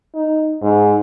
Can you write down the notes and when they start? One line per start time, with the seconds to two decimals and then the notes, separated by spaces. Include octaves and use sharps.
0.15 D#4
0.62 G#2